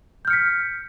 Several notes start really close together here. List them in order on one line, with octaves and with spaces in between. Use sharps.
G6 F6 C#7 B6